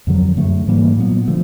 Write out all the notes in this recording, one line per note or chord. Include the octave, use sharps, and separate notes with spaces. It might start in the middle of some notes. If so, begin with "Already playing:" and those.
F2 D3 F#3
F#2 D3 F#3 A3
G#2 E3 G3 A#3
A#2 F#3 B3
D3 F3 A3